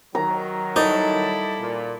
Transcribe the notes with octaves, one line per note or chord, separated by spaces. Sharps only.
D#3 F#3 A#5
G3 D#4 E4 A4 D5
A#2